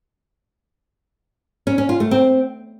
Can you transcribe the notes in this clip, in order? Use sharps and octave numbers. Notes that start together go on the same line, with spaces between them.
C#4
C#4
F4
A3
C4